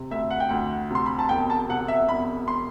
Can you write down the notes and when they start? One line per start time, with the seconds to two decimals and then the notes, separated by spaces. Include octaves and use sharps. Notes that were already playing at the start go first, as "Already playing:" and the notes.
Already playing: C3
0.11 D2 E5
0.30 F#5
0.40 G5
0.49 D2 F#5
0.90 C3 C6
1.06 B5
1.19 A5
1.29 E1 G5
1.50 A5
1.69 C3 F#5
1.88 E5
2.08 E1 B5
2.48 C6